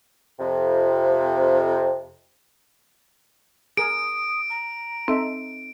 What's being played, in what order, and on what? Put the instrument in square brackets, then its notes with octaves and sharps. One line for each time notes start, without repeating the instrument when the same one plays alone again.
[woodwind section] F2 C3
[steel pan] G#4 A#4 [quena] D#6 [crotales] D7
[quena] A#5
[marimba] C4 [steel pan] D#4 A4 E5